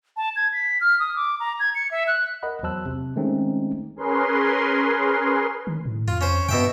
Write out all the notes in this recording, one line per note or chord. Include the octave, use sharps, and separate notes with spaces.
A5
G#6
B6
F6
D#6
D6
A#5
G#6
C#7
E5
F#6
A#4 D#5 F#5 B5
E2 F#3 C5 A5 E6 F#6
C3
D#3 G#3 A3 C4 C#4 D#4
C#4 G#4 A#4 B4 C6
D#3
A2
F2 F4
C#4 C5
G2 B2 E5 G5